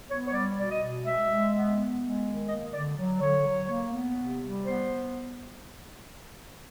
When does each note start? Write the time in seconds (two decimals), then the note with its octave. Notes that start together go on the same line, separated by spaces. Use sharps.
0.09 B3 C#5
0.28 C#5
0.33 G3 D5
0.57 B2 D5
0.70 D#5
0.82 B2
1.06 G#3 E5
1.29 G#3
1.54 B3
1.76 B3
2.00 G#3
2.26 D#3
2.48 A#3 D#5
2.72 D3 D5
2.97 F#3
3.21 D3 C#5
3.45 F#3
3.69 A#3
3.93 B3
4.17 C3
4.41 G3
4.65 B3 C5